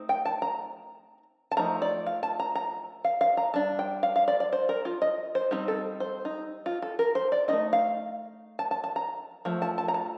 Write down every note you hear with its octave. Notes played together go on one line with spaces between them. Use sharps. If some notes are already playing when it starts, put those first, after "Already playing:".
Already playing: A3 C4 D#4
G5
A5
A#5
A5
F3 A3 D#4 A#5
D5
F5
A5
A#5
A#5
F5
F5
A#5
G3 D4 A5
G5
F5
F5
D5
D5
C5
A#4
F4
D#5
C5
G3 C4 D#4 G4
A4
C5
D#4
F4
A4
A#4
C5
D5
C4 D#4 D#5
A3
F5
A5
A5
A5
A#5
F3 A3
A5
A5
A#5
A5